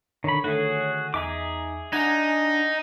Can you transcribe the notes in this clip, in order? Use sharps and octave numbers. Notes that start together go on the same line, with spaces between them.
D3 D#3 C#5 B5
D3 D#3 A3 F#4 G#4
E2 D#4 G#4 E5 G#5 A#5 D6
D4 D#4 F#5 G#5